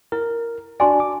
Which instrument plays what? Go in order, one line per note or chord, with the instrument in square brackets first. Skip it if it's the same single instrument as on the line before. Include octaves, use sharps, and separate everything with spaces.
[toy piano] E4 [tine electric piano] A#4
[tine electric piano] D4 F#4 D5 [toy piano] G#5 C6
[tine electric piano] D6